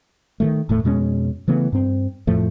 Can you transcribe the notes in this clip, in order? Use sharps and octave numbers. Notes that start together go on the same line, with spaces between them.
D#3 F3 A3
D#1 A2 A3
F2 B2 G#3 C#4
C#3 E3 A3 B3
G2 C4
F2 A2 F3 A3